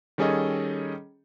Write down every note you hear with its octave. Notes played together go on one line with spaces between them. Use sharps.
D#3 G3 C#4 G#4 A4 D#5